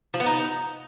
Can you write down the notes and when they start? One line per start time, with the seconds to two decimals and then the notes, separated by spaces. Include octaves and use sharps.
0.14 F3
0.20 B3
0.26 D#4